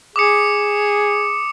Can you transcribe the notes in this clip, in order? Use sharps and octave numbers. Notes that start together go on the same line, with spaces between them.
G#4 D6 D#6 C#7